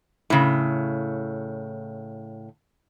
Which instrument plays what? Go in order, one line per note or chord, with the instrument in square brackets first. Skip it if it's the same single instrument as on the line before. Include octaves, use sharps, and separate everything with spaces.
[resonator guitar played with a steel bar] A2 C#3